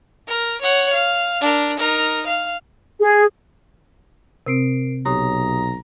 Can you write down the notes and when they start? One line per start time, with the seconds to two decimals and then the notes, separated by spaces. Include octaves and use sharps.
0.28 A#4
0.61 C#5 F#5
0.93 F5
1.41 D4 A#4
1.77 D#4 A#4
2.26 F5
3.01 G#4
4.47 C3 C4 A#4 C7 D7
5.06 B1 G4 C#5 A#5 D#6